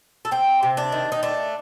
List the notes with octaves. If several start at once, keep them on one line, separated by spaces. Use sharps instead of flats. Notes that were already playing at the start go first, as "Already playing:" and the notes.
A4
C4 G4
C3
D4
D#3
D#4
A3 D4